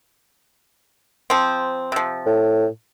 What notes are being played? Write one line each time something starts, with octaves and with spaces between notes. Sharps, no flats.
F3 C4
C3 F3
A2